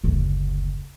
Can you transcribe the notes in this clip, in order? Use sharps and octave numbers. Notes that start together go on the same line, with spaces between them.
F#1 D2